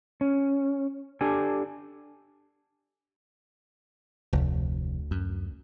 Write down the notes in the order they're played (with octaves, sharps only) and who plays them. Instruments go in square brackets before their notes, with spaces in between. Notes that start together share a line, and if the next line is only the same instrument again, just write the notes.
[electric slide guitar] C#4
D4 G4 A4 G#5
[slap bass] F1 [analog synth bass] D2
[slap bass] F#2